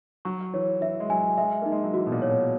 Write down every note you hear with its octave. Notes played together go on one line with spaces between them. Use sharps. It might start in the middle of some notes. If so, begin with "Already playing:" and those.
F#3 C#6
E3 C#5
E3 E5
G#3
F#3 G#5
G#3 E5
A#3 D#4
G#3
F#3
E3 F#4
B2
A#2
C#5
B2